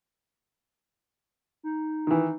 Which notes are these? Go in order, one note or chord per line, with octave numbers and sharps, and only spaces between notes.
D#4
D#3 E3